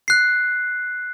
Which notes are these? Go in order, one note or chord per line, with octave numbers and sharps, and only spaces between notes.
F#6 C7